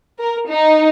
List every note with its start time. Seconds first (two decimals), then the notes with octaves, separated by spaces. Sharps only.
0.19 A#4
0.50 D#4